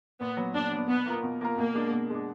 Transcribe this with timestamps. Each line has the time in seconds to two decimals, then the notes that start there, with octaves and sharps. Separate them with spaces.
0.21 A#2 B3
0.37 F#3 B3
0.55 A#2 D4
0.72 F#3
0.77 B3
0.88 B2 B3
1.06 A#3 F4 A#4
1.23 B2
1.41 A#3 F4 A#4
1.58 B2 A#3
1.75 G#3 D4
1.92 B2
2.10 G#3 D4